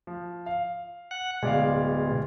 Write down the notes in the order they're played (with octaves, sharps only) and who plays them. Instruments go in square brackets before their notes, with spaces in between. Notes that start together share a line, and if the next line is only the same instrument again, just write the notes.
[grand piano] F3
F5
[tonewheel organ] F#5
[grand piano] D1 D5 F5 [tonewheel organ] B2 G#3